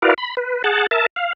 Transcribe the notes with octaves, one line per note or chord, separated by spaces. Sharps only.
E4 F#4 A#4 B4 D5 F5
B5
B4
G#4 F#5 A5
A#4 E5 A5
F5